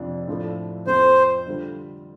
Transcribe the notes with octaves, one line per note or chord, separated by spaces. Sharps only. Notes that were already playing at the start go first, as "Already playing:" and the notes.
Already playing: F2 C3 F3 D4
A2 F3 A3 D4 A4
F2 F3 C4 F4 A4 C5
D3 G3 F4 A4